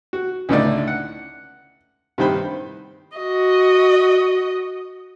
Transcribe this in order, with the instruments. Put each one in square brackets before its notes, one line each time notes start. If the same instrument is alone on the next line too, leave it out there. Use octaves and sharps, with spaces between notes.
[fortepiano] F#4
C#2 A2 D3 A3 D#4 D5
F#5
G2 C3 D#3 C5 B5
[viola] F#4 D#5